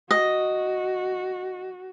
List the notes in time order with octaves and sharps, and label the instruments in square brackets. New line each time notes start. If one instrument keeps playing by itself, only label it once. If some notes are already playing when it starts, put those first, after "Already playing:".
[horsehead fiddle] F#4 [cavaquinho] D#5